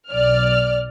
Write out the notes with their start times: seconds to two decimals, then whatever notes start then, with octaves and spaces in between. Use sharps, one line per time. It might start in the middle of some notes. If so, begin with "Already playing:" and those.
0.10 B1 D5 F6